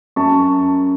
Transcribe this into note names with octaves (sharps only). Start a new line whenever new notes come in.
F#2 A5 C#6